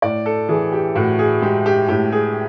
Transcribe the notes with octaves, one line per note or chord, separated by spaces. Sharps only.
A2 D5
A4
E3 G#4
G4
A2 F#4
G#4
G#3 G4
G4
A2 G4
G#4